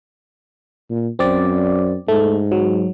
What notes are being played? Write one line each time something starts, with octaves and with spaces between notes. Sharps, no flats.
A#2
F#2 C4 D5
G#2 A3
F#3